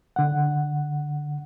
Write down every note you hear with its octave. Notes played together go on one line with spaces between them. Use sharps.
D3 F#5